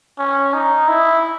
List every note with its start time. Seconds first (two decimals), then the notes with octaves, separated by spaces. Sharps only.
0.19 C#4
0.54 D#4
0.88 E4